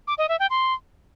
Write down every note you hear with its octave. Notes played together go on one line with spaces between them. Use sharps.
D6
D#5
E5
G5
C6